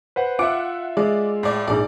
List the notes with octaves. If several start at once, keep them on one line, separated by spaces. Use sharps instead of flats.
B4 C5 F#5
F4 E5 F#5 D6
G#3 D5
A2 D5
A#1 G#2 D5